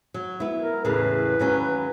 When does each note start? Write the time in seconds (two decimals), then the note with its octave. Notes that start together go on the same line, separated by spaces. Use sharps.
0.14 F#3
0.40 B3 E4
0.60 A#4
0.85 E2 A2 C#3 B4
1.39 D#2 F#3 C#4